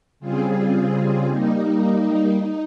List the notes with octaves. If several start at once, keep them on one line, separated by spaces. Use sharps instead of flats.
C#3 G3 C4 F4 G#4
G3 A#3 D#4
D#4